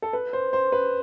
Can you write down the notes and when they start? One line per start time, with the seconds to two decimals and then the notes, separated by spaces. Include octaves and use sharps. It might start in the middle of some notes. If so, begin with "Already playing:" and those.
0.02 A4
0.13 B4
0.33 C5
0.53 C5
0.72 B4